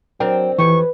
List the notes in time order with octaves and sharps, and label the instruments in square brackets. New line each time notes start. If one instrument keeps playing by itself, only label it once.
[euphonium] F#3 [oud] C4 D4 A#4 [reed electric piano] G5
[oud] F2 G4 [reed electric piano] E3 [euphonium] B4 [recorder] C#6